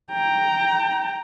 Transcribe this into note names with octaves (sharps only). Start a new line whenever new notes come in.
G5 A#5